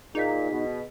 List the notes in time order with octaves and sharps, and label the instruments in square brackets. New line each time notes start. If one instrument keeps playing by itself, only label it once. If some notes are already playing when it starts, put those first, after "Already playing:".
[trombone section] A#2 [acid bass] D#4 [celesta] G#4 D#5 B6
[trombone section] B2